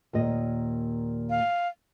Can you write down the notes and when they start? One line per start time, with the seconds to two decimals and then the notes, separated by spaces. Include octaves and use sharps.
0.13 D#2 A#2 D#5
1.30 F5